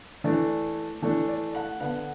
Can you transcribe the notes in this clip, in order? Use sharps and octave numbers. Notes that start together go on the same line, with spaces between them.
E3 A3 D4 D5
E3 A3 D4 A4
D5
F#5
D3 B3 D4 F#5